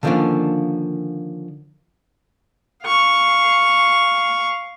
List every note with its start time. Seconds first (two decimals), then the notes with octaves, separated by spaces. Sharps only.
0.03 D3 D#3 F3 A#3 C#4 D4
2.84 F5 C#6